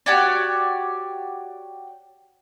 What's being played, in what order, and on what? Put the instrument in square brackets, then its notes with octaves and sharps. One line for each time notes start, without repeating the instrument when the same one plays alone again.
[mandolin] F#4 G4 C#5 D5